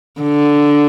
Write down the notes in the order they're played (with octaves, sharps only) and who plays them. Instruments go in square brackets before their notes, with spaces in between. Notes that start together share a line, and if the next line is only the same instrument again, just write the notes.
[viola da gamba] D3